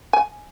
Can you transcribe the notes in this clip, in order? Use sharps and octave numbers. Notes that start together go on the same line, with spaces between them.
G#5